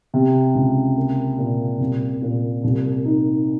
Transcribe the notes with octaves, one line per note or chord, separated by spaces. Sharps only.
C3
C#2
A#3
A#2
C2
A#2
C2
D#4